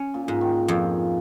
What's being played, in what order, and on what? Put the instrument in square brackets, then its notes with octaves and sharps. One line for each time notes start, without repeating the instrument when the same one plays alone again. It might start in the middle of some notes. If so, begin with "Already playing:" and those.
Already playing: [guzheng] C#4
[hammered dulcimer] A#2
[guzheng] G#2
[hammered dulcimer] D#3
[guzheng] F2 [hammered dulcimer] A#2